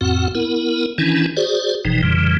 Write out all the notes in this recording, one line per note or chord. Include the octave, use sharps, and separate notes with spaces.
F2 A2 C4 F#4 F#5
B3 E4 A#4
D#3 E3 C#4 D4 E4
F#4 G#4 C5 D5
G1 B2 E3 F3 D#4
F2 A#2 C#3 E3 G3